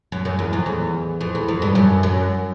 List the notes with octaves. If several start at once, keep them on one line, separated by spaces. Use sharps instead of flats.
F#2
F#2
E2
F2
E2
F2
E2
F2
G2
F#2
F#2